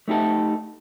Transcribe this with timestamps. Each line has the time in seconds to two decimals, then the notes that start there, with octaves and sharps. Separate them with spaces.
0.08 A3 D#4 G4 A4